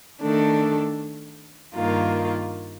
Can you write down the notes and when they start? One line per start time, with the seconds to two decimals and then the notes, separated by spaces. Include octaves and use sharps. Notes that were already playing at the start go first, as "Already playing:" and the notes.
0.21 D#3 A3 D4 A4
1.74 G2 D#3 A#3 F4